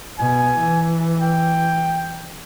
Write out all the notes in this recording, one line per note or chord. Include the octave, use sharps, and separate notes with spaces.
B2 G#5
E3
G5